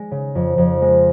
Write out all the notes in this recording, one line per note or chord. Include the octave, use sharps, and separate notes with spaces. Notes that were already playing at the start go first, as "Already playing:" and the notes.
Already playing: G#3
C#3
F2
F2
G#3